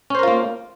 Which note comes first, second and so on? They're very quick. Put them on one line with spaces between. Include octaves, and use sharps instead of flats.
C#4 C5 A#4 F4 A#3